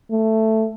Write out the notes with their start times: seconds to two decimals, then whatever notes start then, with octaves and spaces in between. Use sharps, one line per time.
0.11 A3